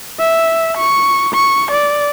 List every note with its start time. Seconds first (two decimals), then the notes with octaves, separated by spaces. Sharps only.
0.19 E5
0.77 C#6
1.34 C#6
1.71 D5